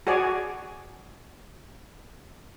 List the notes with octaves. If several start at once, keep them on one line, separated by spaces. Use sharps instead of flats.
F#4 G#4 C#5 D5 G#5